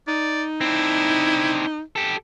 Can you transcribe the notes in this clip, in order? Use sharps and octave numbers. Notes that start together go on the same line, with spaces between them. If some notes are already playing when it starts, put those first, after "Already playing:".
D#4 D5
C4 D4 E4
G4 A4